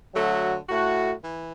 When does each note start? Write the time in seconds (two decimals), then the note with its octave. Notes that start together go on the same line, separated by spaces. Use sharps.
0.14 D3 F#3 A3 F#4
0.68 A2 A3 F#4
1.23 E3